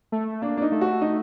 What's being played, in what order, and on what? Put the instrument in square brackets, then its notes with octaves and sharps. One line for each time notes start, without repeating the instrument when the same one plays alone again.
[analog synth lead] A3
[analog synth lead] A#3 [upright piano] D4
[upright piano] D4
D#4
[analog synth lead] A3
[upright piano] F#4
D#4